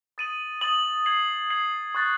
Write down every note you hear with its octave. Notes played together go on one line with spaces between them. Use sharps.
D#6 A6 D#7 F#7
D#6 A6 D#7 F#7
G#6 C7 F#7
G#6 C7 F#7
C#6 F#6 A6